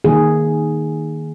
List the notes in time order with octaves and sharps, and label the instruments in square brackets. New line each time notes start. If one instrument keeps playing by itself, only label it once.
[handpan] D#3 A#3 G#4